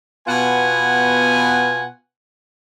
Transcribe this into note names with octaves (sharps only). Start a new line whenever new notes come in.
B2 B3 F4 F#5 G#5